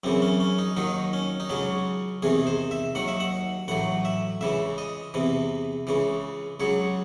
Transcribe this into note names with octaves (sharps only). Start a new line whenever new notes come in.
F#2 C#3 E3 C4
C#4
C#4
D#4
D#2 D#3 F#3 D#4
C#4
D#4
C#2 C#3 F#3 C#4
E2 C3 D#3 G#4
C5
E5
D#2 D#3 F#3 F#5
E5
F#5
A1 A2 F#3 F#5
E5
C#2 C#3 E3 E5
D#5
E2 C3 E3
C#2 C#3 E3
C#2 C#3 F#3 C#5